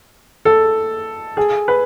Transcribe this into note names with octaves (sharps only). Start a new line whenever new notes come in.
A4
G#4
B4